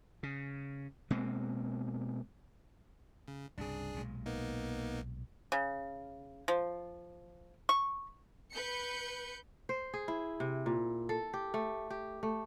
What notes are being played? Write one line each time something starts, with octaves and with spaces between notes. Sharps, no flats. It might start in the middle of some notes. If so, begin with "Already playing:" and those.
C#3
B2 G#3 A#3 C4
C#3
C2 G2 C#3 D4 G#4
B1 A#2 G#3
A#3 B3 D#4
C#3
F3
C#6
B4 G6 C#7
C5
G#4
E4
C3
A#2
A4
G4
A3
G4
A3